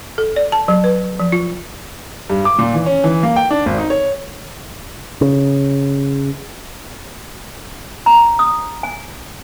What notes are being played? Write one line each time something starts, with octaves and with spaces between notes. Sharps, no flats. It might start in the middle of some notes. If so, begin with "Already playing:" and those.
A4
D5
A5
F#3
B4
F3
F4
G2
D6
A#2
E3
C#4
E3
A#3
G5
D4
G#1
D#4
C#5
C#3
A#5
D#6
G#5